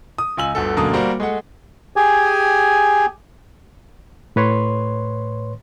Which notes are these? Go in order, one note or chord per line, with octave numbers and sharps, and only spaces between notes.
D#6
C#2 F4 G#5 E6 F#7
G1 D2 A4
E1 F#2 D3 A#3 A5 D#6
G3 A#3 F#4 C5
G#3 A3 F#5
G4 G#4 G#5
A2 B4 C#5 C6